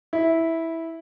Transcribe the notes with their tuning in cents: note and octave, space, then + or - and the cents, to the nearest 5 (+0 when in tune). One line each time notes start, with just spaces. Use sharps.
E4 -10